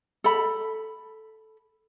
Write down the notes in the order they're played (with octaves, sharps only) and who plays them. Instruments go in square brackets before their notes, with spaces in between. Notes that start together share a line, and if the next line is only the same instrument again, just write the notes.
[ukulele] A4 B5